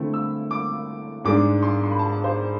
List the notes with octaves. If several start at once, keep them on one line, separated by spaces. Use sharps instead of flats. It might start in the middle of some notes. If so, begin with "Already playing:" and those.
Already playing: D3 A3 C4 E4
E6
D6
G#2 G#3 D4 D6
C6
C6
B5
A5
C5